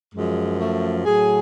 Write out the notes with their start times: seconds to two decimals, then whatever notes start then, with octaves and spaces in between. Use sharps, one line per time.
0.15 F#2 F3 G#3
0.60 A3
1.06 A2 F#3 G#4